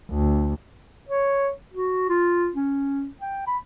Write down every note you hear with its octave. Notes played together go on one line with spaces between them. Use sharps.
D2
C#5
F#4
F4
C#4
G5
B5